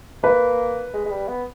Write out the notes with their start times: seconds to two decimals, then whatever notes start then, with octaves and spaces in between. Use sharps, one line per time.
0.23 A#3 B4
0.93 G#3
1.06 G#3
1.12 G3
1.28 B3